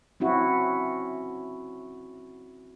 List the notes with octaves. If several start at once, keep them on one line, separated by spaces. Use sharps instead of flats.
C4 C#4 E4 F#4